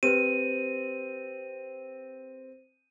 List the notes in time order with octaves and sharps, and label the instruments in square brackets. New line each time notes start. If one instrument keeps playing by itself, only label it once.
[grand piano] C4 [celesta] G4 B4 C5 [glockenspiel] D#7